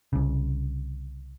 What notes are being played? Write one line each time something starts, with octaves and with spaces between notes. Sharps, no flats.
C2 C#3